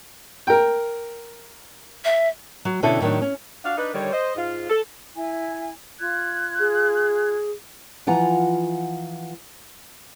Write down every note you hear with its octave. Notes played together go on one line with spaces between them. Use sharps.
A#4 G5
E5
F#3
B2 D3 C#4 E4 A4 G5
A2 D#3 F#3 D4
C#4
D4 F#4 F5
D4 D#4 B4
D3 D#3 G3 C#5
C5 D#5
G#2 F4
A4
E4 G#5
F4 F#6 G#6
G#4
E3 F3 F4 F#5 G#5 A#5